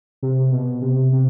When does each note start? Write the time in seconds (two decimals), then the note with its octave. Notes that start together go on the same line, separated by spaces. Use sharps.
0.23 C3
0.52 B2
0.82 C3
1.12 C3